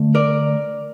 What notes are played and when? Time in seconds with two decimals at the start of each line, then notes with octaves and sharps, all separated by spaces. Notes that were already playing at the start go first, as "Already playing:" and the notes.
Already playing: D3 A3
0.15 A#4 D5